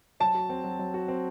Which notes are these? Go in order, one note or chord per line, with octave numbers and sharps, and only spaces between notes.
F#3 A5
F#4
C4
F#3
F#3
F#4
C4